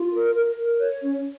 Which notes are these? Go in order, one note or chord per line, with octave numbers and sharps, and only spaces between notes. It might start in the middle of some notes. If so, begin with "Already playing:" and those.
Already playing: F4
A#4
A#4
A#4
C#5
C#4